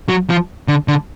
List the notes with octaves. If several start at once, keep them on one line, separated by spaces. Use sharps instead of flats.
F#3
F3
D3
D3